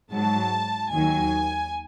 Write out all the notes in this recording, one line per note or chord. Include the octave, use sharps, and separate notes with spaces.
G#2 F#3 A5
D#2 D#3 F#3 G#5